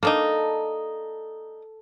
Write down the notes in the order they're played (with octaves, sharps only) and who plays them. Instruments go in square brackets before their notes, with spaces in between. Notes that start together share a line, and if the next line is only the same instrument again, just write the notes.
[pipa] A#3 D4 D#4 [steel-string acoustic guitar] A4